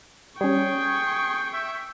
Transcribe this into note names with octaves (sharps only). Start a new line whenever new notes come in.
G3 C#4 G#4 G5 C#6
E5